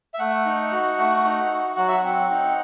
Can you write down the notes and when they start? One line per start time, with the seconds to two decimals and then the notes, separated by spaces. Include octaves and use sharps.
0.14 E5
0.19 A3 F#5
0.46 D#4
0.72 F#4
0.98 A3
1.25 D#4
1.51 F#4
1.76 F#3 F#5
1.88 E5
1.98 F#5
2.03 C4
2.30 D#4